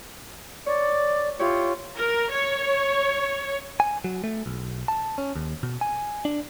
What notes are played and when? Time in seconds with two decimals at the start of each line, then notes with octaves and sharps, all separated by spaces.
0.66 C#5 D5
1.39 E4 F4 G4 C#5
1.96 A#4
2.32 C#5
3.80 G#5
4.04 F#3
4.24 A3
4.46 B1
4.88 A5
5.18 C#4
5.36 D#2
5.63 B2
5.81 G#5
6.25 D4